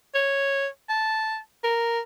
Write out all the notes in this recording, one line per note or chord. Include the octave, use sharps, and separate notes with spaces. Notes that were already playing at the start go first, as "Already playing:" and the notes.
C#5
A5
A#4